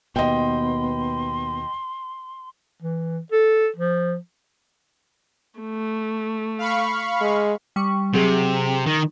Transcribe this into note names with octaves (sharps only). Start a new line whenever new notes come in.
D#2 B2 B3 D#5 G5 C6
E3
A4
F3
A3
F5 B5 C#6
G#3
G3 C#6
C3 F#3 G#4
D#3